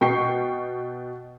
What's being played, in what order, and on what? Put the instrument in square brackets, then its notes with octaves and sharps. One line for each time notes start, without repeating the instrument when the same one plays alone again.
[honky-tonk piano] B2 G5 C#6 C7